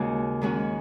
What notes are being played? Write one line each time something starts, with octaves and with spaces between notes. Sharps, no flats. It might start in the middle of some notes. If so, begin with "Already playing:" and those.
Already playing: D#2 C#3 G#3 D#4 F#4
G#2 D#3 G#3 C#4 F#4